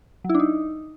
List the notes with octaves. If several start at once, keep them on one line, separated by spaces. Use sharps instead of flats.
F#3
E4
D4
D#4